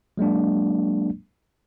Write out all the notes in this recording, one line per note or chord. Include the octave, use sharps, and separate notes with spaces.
F#3 G#3 A#3 D4